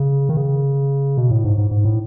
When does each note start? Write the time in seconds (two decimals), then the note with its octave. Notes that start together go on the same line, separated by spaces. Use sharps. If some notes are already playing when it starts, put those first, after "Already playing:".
Already playing: C#3
0.29 D#3
0.37 C#3
1.18 B2
1.31 A2
1.44 G#2
1.58 G#2
1.71 G#2
1.85 A2